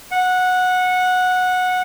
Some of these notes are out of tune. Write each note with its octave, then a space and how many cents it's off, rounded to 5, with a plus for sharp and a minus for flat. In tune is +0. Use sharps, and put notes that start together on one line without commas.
F#5 -15